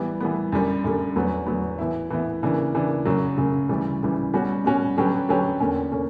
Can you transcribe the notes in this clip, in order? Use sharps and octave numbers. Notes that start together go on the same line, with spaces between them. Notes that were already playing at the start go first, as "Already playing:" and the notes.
Already playing: E3 G3 B3
E3 G3 B3
F#2 D3 G3
F#2 D3 G3
E2 D3 F#3 B3
E2 D3 F#3 B3
E3 B3 E4
E3 B3 E4
C#3 E3 A#3 D4
C#3 E3 A#3 D4
F#2 C#3 F#3
F#2 C#3 F#3
D2 C#3 E3 G3
D2 C#3 E3 G3
B2 G3 C#4 F#4
B2 G3 C#4 F#4
D3 F#3 C#4 G4 B4
D3 F#3 C#4 G4 B4
E2 D3 A#3 C#4
D3 A#3 C#4